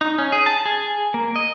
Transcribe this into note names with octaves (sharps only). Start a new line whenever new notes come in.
D#4
C#4
G#4
A5
G#4
A#3
D#5